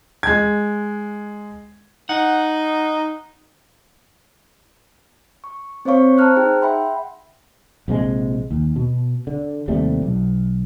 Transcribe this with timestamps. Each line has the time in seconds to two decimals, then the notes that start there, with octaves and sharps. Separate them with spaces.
0.23 G#3 G#6
2.09 D#4 F#5
5.44 C#6
5.85 C4 C5 C#5 F5 C#6 C#7
6.18 C5 A5 A#5 F6 F#6
6.36 D#4 G#4 G5
6.62 E5 F#5 G5 B5 C6
7.88 A#1 C3 E3 G#3
8.51 D#2
8.76 B2
9.27 D3
9.68 D#2 C3 G3 A3
10.02 B1